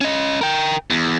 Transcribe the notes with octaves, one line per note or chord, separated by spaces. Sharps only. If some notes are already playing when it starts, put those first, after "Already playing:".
C#4 D#5
A#4 G5
E2